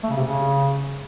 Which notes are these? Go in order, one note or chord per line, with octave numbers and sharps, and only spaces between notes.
A3
C#3
C3
C#3